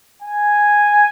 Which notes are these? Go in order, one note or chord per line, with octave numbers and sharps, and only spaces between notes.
G#5